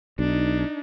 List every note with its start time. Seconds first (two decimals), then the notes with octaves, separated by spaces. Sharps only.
0.19 B1 D4 D#4